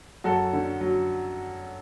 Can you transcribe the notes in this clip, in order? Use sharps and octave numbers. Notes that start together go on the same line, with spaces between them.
F#2 F#4 A4
D3
F#3